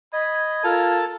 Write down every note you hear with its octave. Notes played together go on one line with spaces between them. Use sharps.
D#5 B5 G#6
F4 A4 A#4 A5